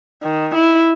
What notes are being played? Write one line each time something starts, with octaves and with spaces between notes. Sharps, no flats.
D#3
E4